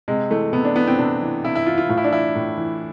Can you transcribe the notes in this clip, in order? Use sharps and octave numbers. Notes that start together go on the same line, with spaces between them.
C3 G#3
E3 A3
C3 B3
D4
E3 B3
C4
C3 D4
E3
C3 E4
E4
E3 F4
F4
A2 F4
E4
D4
E3 E4
A2
E3